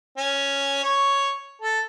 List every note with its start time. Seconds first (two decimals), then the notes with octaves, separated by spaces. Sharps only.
0.17 C#4
0.83 C#5
1.61 A4